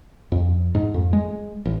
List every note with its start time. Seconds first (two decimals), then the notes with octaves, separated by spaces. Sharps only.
0.32 F2
0.75 G#2
0.94 F2
1.13 G#3
1.65 A1